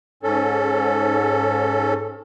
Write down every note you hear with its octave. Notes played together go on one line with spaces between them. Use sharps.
G#2 C#4 A4